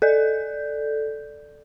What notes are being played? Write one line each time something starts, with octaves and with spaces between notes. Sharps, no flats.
A4 D5 G6